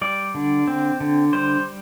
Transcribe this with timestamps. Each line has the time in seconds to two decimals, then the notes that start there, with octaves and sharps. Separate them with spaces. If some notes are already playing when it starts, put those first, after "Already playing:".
0.01 G3 D5
0.34 D3
0.67 C4
1.00 D3
1.33 G3 C5